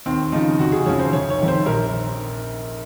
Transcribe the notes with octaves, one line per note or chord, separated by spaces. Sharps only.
D#2 C4
C#3 F3 D#4
F1 F#4
G#4
F2 C#3 F3 C#5
C5
F1 C#5
C#5
F2 D#3
C5
A#1 A#4